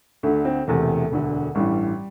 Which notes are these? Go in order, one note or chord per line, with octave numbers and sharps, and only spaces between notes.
D2 D3 A3
C4
E1 E2 C3 E3 A3
E1 D2 D3
A1 G2 E3 G3